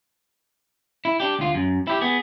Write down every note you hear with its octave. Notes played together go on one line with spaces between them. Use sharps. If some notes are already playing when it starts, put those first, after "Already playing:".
E4
D4 G4
D2 F4
F#2
E4 G4
B3 G#4